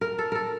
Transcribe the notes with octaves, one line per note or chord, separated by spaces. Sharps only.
A#4
A4
A4 A#4